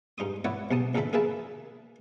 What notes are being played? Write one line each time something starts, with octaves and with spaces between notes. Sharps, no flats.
G2 D#4 C6 D#6
E4 B4 C#5 D5 F#5
B1 C3 A5 D#6
A#1 D3 E3 A4 E5 B5
A#3 G#4 B4 E5 A5